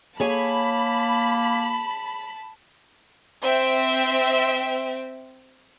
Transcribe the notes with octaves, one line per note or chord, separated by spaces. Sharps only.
A#3 G#4 C#5 G#5 A5 B5
C4 E5 G5